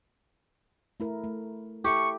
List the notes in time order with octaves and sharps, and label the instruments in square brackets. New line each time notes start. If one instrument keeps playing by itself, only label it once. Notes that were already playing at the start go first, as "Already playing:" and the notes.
[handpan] A3 E4 A#4
A3
[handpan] E4 A4 E5 [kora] G4 [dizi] C#6